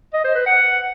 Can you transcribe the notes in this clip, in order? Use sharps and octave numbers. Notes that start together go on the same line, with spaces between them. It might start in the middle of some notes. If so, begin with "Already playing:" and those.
D#5
C5
B4
F#5